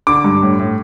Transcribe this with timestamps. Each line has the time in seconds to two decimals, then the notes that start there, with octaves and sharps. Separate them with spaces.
0.07 D3 D6
0.24 G2
0.42 A2
0.59 A2